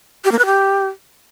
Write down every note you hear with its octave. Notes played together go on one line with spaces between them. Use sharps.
G4
A#3
B4
G4